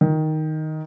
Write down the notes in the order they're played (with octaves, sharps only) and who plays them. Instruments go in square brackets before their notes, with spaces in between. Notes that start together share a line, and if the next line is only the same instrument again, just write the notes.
[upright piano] D#3